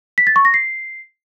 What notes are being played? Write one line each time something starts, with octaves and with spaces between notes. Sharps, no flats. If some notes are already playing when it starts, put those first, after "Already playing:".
B6
A6
C#6
A#6
C7